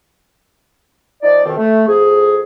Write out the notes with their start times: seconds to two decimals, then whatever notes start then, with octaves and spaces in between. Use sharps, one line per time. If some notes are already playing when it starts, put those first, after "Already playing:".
1.23 F3 D#4 D5
1.45 F2 B2 D#3 C4
1.57 A3
1.87 F2 G#4